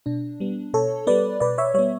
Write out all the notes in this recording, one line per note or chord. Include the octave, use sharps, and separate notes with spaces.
B2 D4
G3 B3
B2 A4 C#5
G3 B3 B4 D5
B2 B4 D5
C#5 E5
G3 B3 C#5 E5